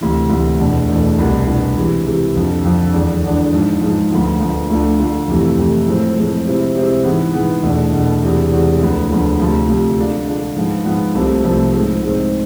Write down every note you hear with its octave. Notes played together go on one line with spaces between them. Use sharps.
D2 C3 E3
D2 C3 E3
E2 B2 A3 D4
E2 B2 A3 D4
C2 B2 B3 D4
C2 B2 B3 D4
C3 E3 G#3
C3 E3 G#3
F2 D3 F3
F2 D3 F3
E2 D3 G#3 D4
E2 D3 G#3 D4
G#2 F3 G#3
G#2 F3 G#3
D2 D3 F3 B3
D2 D3 F3 B3
D2 D3 A3 D4 F4
D2 D3 A3 D4 F4
F2 C3 E3 A3
F2 C3 E3 A3
A2 F3 G#3 C4
A2 F3 G#3 C4
C3 G#3 C4 E4
C3 G#3 C4 E4
G#2 E3 G#3 B3
G#2 E3 G#3 B3
E2 B2 A3 D4
E2 B2 A3 D4
E2 C3 G#3
E2 C3 G#3
D2 D3 F3 B3
D2 D3 F3 B3
D2 C3 F3
D2 C3 F3
D3 G#3 D4 F4
D3 G#3 D4 F4
G#2 F3 B3 F4
G#2 F3 B3 F4
C2 C3 F3 A3 C4
C2 C3 F3 A3 C4
G#2 G#3 C4
G#2 G#3 C4